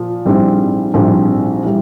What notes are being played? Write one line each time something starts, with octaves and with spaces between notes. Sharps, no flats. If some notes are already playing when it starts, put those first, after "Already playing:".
Already playing: A#2 F3
A#1 G#2 G3 C4 E4
A#1 G#2 G3 C4 E4
E3 G3